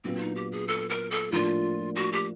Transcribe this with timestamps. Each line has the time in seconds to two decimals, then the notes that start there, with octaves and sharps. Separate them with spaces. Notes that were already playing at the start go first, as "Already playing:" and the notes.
0.04 A#2 F#3 B3 C4 D4 F4
0.20 D#4
0.36 G4
0.52 G#4
0.68 A4
0.89 A#4
1.11 A4
1.31 A2 F3 A#3 D4 F4
1.96 F#4
2.12 G4